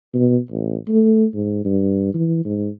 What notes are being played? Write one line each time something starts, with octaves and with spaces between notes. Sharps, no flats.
B2
A1
A3
G#2
G2
E3
G#2